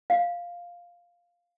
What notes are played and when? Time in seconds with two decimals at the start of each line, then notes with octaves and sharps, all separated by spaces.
0.10 F5